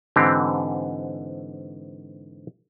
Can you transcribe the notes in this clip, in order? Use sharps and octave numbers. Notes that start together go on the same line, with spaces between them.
G#2 D3 E3 C4 G4